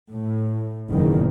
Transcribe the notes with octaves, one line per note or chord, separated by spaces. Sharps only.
A2
F#1 E2 A#2 D#3